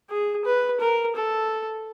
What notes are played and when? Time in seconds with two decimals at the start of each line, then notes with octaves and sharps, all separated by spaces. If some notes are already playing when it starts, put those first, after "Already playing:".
0.10 G#4
0.45 B4
0.80 A#4
1.16 A4